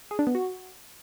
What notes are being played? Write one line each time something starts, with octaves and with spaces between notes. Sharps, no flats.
G#4
D4
B3
F#4